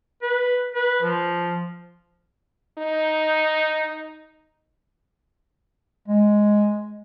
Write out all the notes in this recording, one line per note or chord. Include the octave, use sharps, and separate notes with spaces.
B4
B4
F3
D#4
G#3